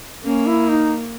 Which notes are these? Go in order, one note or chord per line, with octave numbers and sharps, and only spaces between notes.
A#3 C#4
E4
D#4